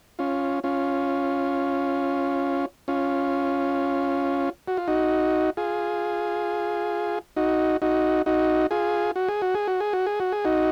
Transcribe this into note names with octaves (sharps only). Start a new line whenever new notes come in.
C#4 F4
C#4 F4
C#4 F4
F#4
F4
D#4 F#4
F4 G#4
D#4 F#4
D#4 F#4
D#4 F#4
F4 G#4
F#4
G#4
F#4
G#4
F#4
G#4
F#4
G#4
F#4
G#4
D#4 F#4